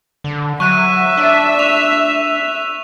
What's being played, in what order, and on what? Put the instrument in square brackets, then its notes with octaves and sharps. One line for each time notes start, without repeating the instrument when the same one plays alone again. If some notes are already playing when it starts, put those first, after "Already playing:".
[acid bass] D3
[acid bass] F#3 [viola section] E5 [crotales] C#6 F#6 D#7
[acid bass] D4
[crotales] C#6 F7